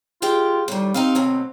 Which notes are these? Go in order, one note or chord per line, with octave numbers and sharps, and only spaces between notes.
G#3 F4 G4 G5
A2 D#3 G3
C4 D#4 G4 F5
D2 B2 F#3